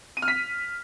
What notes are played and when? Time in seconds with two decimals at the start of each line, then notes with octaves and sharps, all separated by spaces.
0.17 D#7
0.22 F6
0.28 B6